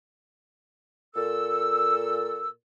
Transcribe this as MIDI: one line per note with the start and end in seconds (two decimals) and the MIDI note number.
1.15 2.48 46
1.15 2.48 69
1.15 2.48 88